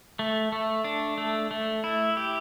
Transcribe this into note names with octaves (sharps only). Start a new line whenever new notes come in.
A3
A3
D4
A3
A3
E4
G4